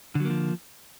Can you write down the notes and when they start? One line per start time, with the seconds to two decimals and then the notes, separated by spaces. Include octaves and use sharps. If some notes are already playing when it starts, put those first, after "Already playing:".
0.15 D3
0.20 F#3
0.25 A#3
0.30 F3